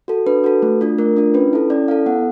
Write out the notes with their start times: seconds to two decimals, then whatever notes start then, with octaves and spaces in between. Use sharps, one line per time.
0.08 F#4 A4
0.26 D4 B4
0.44 F#4 A4
0.62 A3
0.81 D4 F4
0.99 A3 A#4
1.17 D4 F4
1.34 C#4 B4
1.53 E4 A4
1.70 C#4 D5
1.88 E4 A4 F5
2.06 B3 F#5